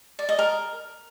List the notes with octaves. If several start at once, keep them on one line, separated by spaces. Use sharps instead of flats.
D5
D#5
A#4